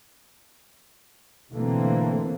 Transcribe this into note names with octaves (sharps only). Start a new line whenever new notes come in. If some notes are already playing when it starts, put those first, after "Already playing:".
B2 D3 E3 A3 A#3 C4